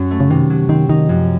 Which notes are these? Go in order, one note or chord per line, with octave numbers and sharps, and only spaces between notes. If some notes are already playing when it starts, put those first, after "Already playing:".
Already playing: F#2 F#3 C#4
A3
C#3
C3 D#3
F#3
D#3 C4
D#3 D#4
F#2 F3